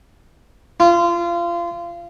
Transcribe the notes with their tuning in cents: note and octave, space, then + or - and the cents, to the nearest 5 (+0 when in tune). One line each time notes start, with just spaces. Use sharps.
F4 -25